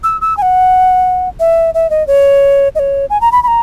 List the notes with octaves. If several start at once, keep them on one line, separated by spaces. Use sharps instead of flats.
E6
E6
G#5
F#5
E5
E5
D#5
C#5
D#5
C#5
G#5
A#5
B5
B5
A#5